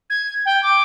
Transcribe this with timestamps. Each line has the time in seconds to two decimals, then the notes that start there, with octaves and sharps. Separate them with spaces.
0.10 G#6
0.46 G5
0.63 D6